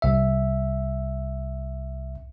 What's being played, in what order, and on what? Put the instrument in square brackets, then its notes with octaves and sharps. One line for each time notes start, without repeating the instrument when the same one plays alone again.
[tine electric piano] C2 E5